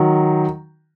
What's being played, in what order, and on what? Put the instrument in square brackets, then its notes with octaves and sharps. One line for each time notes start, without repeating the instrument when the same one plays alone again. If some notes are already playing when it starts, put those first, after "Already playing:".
Already playing: [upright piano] D#3 F#3